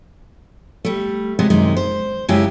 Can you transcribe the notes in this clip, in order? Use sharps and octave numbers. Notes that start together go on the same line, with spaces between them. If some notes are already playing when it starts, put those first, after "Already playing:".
G3 A3
C3 F#3 G#3
F#2 C3 D#3 G#3
C5
F#2 C#3 G#3 E4 G4